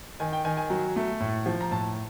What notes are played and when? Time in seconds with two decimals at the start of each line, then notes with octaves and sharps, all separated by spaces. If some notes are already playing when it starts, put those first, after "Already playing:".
0.20 D#3 G#5
0.33 G5
0.45 D#3 G#5
0.57 G#5
0.70 F#3
0.96 A3
1.20 A2
1.46 F3
1.61 A#5
1.71 A2 A5